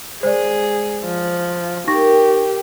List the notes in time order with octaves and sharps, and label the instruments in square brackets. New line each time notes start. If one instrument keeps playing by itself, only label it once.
[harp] G#3 [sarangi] G#4 [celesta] C5 D5
[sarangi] F3
[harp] A#3 [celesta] D#4 C#6 A#6 [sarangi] G4